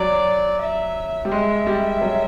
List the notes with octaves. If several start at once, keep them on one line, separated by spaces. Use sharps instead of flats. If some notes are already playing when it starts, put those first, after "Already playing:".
Already playing: F#3 D5
E5
G3
G#3 E5
G3
F#3